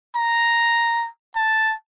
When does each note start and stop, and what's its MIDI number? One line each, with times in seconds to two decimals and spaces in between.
0.16 1.08 82
1.36 1.73 81